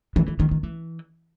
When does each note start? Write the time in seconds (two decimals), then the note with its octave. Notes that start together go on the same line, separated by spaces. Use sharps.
0.16 E3
0.28 E3
0.40 D#3
0.51 D#3
0.63 E3